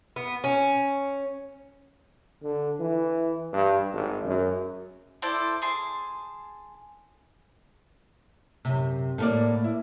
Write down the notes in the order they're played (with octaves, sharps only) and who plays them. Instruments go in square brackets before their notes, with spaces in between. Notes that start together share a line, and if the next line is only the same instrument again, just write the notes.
[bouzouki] B3
C#4
[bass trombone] D3
E3
G2
G#1
F#2
[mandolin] E4 A4 C5 D5
G#4 A5 C6
[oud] F#2 C3
A2 A#3 D5
E4